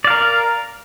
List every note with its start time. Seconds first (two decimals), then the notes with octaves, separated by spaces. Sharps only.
0.05 D5
0.07 F5
0.10 A#4